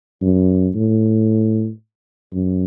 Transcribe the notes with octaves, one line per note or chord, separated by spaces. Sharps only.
F#2
A2
F#2